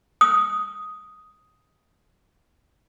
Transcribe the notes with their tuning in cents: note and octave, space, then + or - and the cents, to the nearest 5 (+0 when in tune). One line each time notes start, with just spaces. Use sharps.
D#6 +5